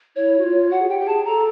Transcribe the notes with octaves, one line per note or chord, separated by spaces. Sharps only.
E4 C#5
F#4
F4
F#4 F#5
G#4
G4 G5
G4
G#4 A5
A4 A#5